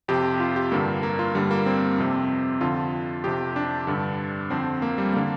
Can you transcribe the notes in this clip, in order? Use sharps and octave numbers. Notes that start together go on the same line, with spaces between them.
F2 C3 G4
F4
G4
G2 D3 A#3
A#3
F4
G2 D3 G3
A#3
C4
F2 C3
F2 D3 F4
F2 C3 G4
D4
G2 D3
F2 D3 C4
A#3
G3
D3 A#3